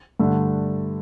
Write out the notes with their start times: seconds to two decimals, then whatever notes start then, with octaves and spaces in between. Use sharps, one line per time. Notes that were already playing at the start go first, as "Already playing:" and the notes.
0.20 G2 D3 A3 D4